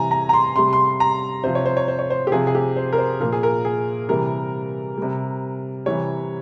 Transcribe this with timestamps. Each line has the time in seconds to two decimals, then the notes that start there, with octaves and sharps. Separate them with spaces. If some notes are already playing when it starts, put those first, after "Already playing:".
Already playing: C3 E3 G3 G#5 A#5
0.11 A#5
0.29 A#5
0.33 C6
0.56 C3 G3 C6
0.73 C6
1.00 A#5
1.44 C3 F3 C5
1.55 C#5
1.66 C5
1.77 C#5
1.88 C5
1.99 C#5
2.10 C5
2.27 G4
2.32 C3 F3 G#4
2.47 G#4
2.55 G4
2.76 C5
2.93 A#4
2.98 C5
3.20 A#2 F3 A#4
3.32 G#4
3.43 A#4
3.65 G#4
4.09 C3 E3 G3 A#4
4.98 C3 G3
5.86 C3 E3 G3 C#5